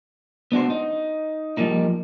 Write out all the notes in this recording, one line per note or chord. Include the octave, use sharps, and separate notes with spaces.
B3 D4 F#4 C5
D#4
F3 G3 A#3 D#4